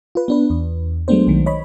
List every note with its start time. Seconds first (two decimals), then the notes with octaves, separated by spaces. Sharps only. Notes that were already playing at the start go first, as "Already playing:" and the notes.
0.15 F4 B4
0.28 B3 D4 B4
0.50 E2
1.08 F#3 G#3 A3 B3 D4 C5
1.27 B1 D#3
1.46 C#5 D#5 B5